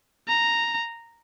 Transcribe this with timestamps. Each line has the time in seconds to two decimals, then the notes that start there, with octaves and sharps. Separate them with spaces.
0.28 A#5